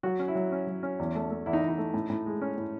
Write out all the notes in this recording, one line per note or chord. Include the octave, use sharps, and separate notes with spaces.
F#3 F#4
C#4
E4
F#3
C#4
F#3
C#4
E2
A3
A3
E2 E4
D#4
E2
D#4
A3
A2
A2
G#3
C#4
A2